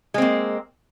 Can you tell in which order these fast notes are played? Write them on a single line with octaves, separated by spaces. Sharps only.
G#3 C4 A#3